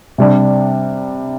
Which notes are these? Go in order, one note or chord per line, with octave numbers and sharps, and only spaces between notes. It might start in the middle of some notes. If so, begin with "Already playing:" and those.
C3 G3 D4